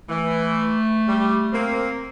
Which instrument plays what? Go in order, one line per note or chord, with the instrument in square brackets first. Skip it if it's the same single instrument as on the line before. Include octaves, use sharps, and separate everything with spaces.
[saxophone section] E3 [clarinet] A3
[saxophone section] G3
A#3 C4